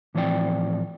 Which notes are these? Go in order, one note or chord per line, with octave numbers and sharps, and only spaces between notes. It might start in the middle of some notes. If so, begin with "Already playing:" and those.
A2 E3 F3 C4 D5 G5